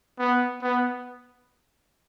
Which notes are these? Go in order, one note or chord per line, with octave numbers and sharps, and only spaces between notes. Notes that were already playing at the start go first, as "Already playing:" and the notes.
B3
B3